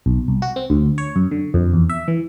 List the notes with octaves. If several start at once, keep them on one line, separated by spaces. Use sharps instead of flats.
B1
C2
F#4
C4
D2
C#5
F#2
D3
F2
E2
E5
E3